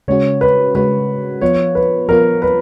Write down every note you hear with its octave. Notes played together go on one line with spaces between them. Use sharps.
C#3 G#3 C#4 F#4 C#5
B4
C#3 G#3 C#4 F#4 B4
F3 B3 F4 C#5
B4
F3 B3 F4 A#4
B4